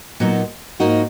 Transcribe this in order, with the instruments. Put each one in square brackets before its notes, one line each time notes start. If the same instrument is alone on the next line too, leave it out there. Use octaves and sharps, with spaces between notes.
[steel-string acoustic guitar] A#2 F#3 B3 D#4 F#4
G#2 F3 A#3 D#4 F#4